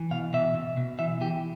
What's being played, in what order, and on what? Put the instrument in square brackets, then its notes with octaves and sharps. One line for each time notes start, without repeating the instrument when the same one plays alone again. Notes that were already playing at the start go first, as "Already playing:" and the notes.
Already playing: [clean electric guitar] E3
B2 F5
B2 E5
B2
B2
E3 E5
E3 G4